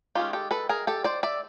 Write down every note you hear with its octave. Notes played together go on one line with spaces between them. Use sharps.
D#3 G#3 C#4 F4 G4
G4 A4
A4 B4
G#4 A#4
G4 A4
C5 D5
D5 E5